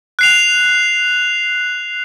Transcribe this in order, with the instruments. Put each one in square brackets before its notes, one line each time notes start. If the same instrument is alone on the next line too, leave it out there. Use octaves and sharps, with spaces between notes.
[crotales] F#6 C7 F7